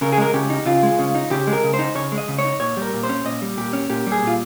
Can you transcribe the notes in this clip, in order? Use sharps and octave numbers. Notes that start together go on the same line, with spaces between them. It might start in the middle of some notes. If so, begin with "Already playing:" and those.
C#3 A#4
G#4
G#3 A#4
C#3 G4
D#4
C#3 F4
G#3
C#3
D#4
C#3 G4
G#3
A#4
C#3
C5
D#4
C#3 C#5
G#3
D#5
C#3
C#5
D#4
A#2 C#5
G3
A#4
A#2
C5
C#4
A#2 D#5
G3
A#2 G4
C#4
A#2 G4
G3
G#4
A#2 F4